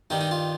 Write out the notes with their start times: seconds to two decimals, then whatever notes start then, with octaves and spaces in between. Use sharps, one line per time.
0.10 G2 D#3 G3 D#4
0.21 D#4
0.31 F4